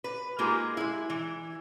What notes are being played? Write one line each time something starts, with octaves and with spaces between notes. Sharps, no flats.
B4
G#3 A#3 D#4 F4 G4 G#4
G#3 E4
E3